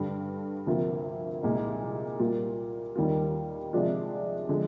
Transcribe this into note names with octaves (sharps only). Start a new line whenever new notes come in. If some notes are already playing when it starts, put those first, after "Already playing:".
Already playing: G2 D3 G3
D2 C3 F3 A#3 F4
C2 A#2 G#3 D#4
A#2 G3 A#3 F4
D#2 D#3 G3 A#3 F4
C3 F3 G#3 D4 F4
D3 F3 G#3